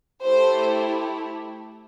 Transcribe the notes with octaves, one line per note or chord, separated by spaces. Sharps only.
A3 E4 G4 C5